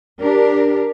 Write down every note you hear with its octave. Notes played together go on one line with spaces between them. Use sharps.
D4 G4 A#4